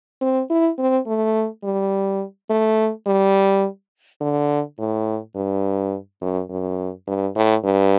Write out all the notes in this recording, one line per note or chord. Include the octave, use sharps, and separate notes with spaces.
C4
E4
C4
A3
G3
A3
G3
D3
A2
G2
F#2
F#2
G2
A2
G2